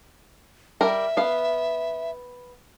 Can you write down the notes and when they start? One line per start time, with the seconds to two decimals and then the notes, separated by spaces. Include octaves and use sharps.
0.81 G3 A#4 E5
1.17 B3 F5